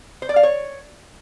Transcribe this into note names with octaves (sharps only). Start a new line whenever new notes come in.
C5
D5
F5
C#5